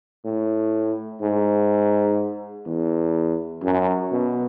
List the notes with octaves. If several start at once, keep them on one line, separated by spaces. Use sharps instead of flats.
A2
G#2
E2
F#2
B2